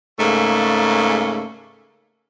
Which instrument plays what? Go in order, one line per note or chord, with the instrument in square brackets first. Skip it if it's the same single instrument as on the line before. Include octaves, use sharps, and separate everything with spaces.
[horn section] G#2 C#3 A3 A#3